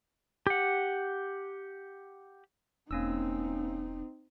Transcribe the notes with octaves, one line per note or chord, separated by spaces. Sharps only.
G4 F#5
E1 A#3 C4 C#4 D#4 E6